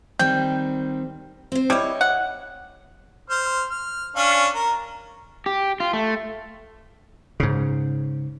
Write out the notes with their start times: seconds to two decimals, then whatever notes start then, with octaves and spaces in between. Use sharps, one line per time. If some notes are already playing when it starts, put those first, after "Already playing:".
0.19 D#3 G3 C4 G5
1.52 C4 C5
1.70 G3 E4 C#5 D#5
2.01 F#5
3.30 C5 F6
3.70 F6
4.16 C#4 D4 F5
4.55 A#4
5.46 G4
5.80 F4
5.93 A3
7.40 G#2 C#3